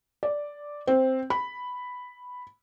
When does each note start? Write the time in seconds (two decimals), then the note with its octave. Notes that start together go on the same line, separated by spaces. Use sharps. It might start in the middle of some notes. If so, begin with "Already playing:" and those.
0.23 D5
0.87 C4
1.30 B5